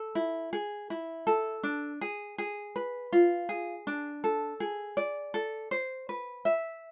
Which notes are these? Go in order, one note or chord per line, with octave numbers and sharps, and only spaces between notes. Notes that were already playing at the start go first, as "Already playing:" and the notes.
Already playing: A4
E4
G#4
E4
A4
D4
G#4
G#4
B4
F4
G#4
D4
A4
G#4
D5
A4
C5
B4
E5